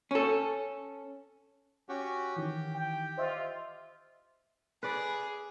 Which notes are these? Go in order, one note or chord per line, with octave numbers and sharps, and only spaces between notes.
C#4 A4
C#4 F#4 G4
D#3 E3 G4
G5
F4 C5 D#5 E5
G#4 B4 D5